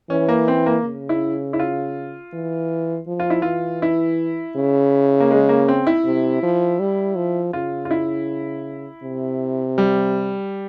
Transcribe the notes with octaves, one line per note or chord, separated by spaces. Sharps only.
E3 C#4
A#3
C4
A#3
C#3
E4
E4
F4
E3
F3
F4
E4
E3 F4
E4
C#3
A#3
G#3
A#3
C4
E4
C3
F3
G3
F3
C#3 F4
F4
E4
C3
G3